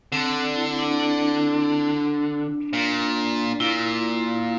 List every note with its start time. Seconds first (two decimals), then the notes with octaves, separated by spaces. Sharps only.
0.12 D3 C4
0.56 E4
0.79 D4
1.00 D4
2.73 A#2
3.60 A#2 E4